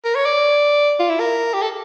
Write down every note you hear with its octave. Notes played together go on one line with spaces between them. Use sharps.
A#4
C#5
D5
F4
E4
A#4
G4
A4